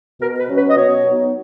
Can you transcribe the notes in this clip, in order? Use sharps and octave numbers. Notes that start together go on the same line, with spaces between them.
B2 A#4
B4
F#3 C#4
B4
D#5
B2 C#5
F#3 B3 D#4